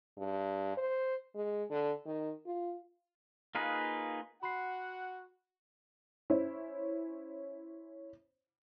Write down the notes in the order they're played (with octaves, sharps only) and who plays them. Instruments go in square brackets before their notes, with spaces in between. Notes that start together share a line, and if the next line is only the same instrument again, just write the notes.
[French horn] G2
C5
G#3
D3
D#3
F4
[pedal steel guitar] A#3 D#4 F4 G#4 B4
[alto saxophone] F#4 [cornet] F#5 [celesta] B5 C6 C7
[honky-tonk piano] C#4 E4 C5